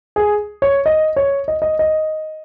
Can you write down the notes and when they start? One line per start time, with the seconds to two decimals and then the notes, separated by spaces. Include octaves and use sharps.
0.16 G#4
0.62 C#5
0.86 D#5
1.16 C#5
1.48 D#5
1.62 D#5
1.79 D#5